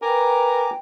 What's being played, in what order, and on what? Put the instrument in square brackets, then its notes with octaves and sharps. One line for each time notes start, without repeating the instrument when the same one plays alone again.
[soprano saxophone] A#4 [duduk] B4 [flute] G5 [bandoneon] G#5 A#5 D6